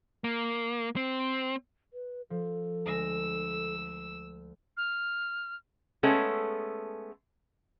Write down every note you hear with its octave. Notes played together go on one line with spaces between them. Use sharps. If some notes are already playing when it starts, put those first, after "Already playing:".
A#3
C4
B4
F3 A4
D2 G#3 E6 A#6
F6
G#3 A3 B3 C#4 A4